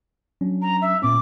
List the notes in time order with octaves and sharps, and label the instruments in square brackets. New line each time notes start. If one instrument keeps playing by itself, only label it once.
[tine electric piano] F#3 C#4 D4
[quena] A#5
E5
[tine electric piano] A#2 B3 C#4 [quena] D6